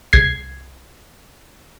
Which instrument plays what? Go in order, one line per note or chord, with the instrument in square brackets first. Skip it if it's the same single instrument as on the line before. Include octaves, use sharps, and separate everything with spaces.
[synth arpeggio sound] C2 G#6 C7